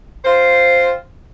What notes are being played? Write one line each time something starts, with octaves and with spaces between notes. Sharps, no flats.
C4 F4 C5